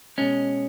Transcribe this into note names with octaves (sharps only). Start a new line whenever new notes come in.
B2 G#3 C#4